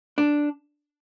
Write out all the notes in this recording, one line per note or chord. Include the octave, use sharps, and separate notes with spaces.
D4